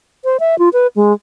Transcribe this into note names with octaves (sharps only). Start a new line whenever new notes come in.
C5
E5
F4
B4
G#3